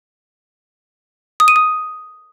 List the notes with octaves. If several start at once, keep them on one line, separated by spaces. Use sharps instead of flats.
D#6
D#7
D#6